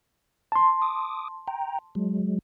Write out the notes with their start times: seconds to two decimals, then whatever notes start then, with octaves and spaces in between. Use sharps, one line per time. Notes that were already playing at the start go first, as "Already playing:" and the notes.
0.52 A5 C6
0.82 D6 D#6
1.48 G5 A#5
1.95 F#3 G#3